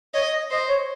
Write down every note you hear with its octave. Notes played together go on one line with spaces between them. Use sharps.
C#5 D#5
D#5
C5 D#5
C#5